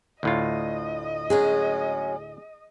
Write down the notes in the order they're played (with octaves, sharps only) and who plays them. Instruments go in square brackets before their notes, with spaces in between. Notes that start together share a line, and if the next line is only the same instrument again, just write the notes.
[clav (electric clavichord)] D2 A2 F4 [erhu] D#5
[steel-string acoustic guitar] F#3 G#3 C#4 [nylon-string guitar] G#4